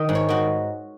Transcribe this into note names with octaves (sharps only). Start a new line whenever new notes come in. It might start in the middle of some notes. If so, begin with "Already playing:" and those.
Already playing: D#3 D#5
G#2
C#5
D#3 F#4